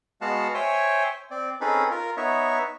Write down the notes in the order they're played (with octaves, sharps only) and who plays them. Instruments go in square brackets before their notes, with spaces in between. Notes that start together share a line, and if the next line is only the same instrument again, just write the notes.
[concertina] G#3 B3 F#4 F5 F#5 A5
C5 C#5 E5 G5 G#5
C4 D5
C4 C#4 D#4 G#4 A4 B4
F4 A#4
B3 D#4 C#5 E5